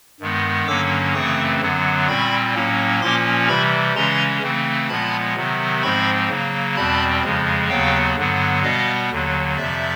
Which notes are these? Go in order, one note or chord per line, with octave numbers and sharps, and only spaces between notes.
G2 D#3 G#3 B3
G2 D3 F#3 A#3 C#4 D6 E6
F#2 C#3 E3 A3 C4 C#6 D#6
F#2 D3 F#3 B3
A#2 G3 C4 B5 C#6
A2 F#3 A#3 C#4
A#2 F3 A#3 C#4 C6 D6
C3 E3 G3 B5 C#6
C#3 E3 G#3 C#4 A#5 C6
C#3 E3 A3 C4
A#2 F3 G#3 B3 A5 B5
C3 D#3 F#3 B3
G#2 F3 G#3 C4 B5 C#6
C#3 F#3 A#3
E2 B2 G3 C4 A5 B5
F2 C#3 F3 G#3
D#2 C#3 F#3 B3 F5 G5
G2 D3 F#3 B3
B2 G3 B3 D#5 F5
D#2 D3 F#3
F2 C3 F3 D5 E5